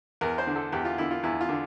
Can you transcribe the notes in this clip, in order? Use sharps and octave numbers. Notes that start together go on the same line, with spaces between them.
E2 A#4
C5
D3
A4
E2 G4
F4
D3 E4
F4
E2 E4
F4
D3